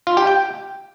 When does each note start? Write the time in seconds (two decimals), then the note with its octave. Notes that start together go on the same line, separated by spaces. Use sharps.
0.07 F4
0.17 G4
0.27 G5